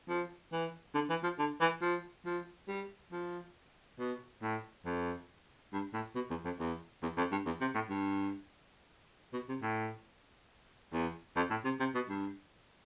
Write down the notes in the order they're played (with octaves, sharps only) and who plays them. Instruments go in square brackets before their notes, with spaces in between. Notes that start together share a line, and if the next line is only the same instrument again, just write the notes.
[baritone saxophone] F3
E3
D3
E3
F3
D3
E3
F3
F3
G3
F3
B2
A2
F2
G2
A2
B2
E2
F2
E2
E2
F2
G2
E2
C3
A2
G2
B2
C3
A2
E2
F2
A2
C3
C3
B2
G2